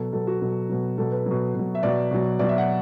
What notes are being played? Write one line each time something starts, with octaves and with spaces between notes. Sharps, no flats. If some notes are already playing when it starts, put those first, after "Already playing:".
Already playing: B2 F#3 A4
B2 F#3 A4
F#4
B2 F#3 A4
B2 F#3
B2 F#3 A4
B4
B2 F#3
B2 F#3
E5
B2 F#3 D5
B2 F#3
B2 F#3 D5
E5
F#5